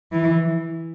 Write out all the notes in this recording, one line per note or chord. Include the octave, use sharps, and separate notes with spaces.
E3